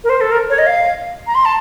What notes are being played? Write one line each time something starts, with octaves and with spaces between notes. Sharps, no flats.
A#4
C5
A4
A#4
C#5
D#5
F5
A#5
C6
A5